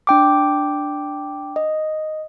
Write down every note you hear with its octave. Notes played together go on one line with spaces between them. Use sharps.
D4 G5 D6
D#5